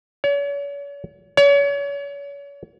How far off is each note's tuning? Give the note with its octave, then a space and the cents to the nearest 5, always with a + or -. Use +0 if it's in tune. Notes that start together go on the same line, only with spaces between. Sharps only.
C#5 +40
C#5 +35